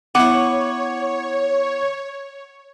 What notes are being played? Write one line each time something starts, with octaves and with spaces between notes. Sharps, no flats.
B3 E4 C#5 F#5 D6